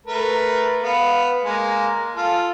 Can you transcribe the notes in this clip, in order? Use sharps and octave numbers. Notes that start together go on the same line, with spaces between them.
A3 A#4 B4
B3 F5
G#3 A#3
F4 A4